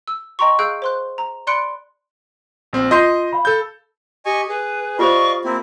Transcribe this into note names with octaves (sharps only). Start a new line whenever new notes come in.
E6
D#5 G5 A#5 C6 C#6
G#4 F5 E6 F#6 G6 D7
C5 C6 F#6
A#5
D5 B5 C6 F#6 C#7 D7
A#1 C4
F4 D#5 C6 G6 C7
F5 B5
A4 G6
G4 D#5 G#5 C#6
G#4 B4
F4 G4 C5 D5 D#5 F5 C#6
A#3 C4 E4 A#4